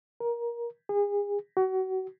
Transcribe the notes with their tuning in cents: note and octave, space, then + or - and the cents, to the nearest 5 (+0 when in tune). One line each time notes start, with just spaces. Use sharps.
A#4 +20
G#4 -35
F#4 +30